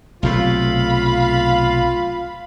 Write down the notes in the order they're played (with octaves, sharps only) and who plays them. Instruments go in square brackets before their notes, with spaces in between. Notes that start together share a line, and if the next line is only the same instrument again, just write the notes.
[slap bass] B1 C3 A3 [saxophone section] F4 [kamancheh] F5 B5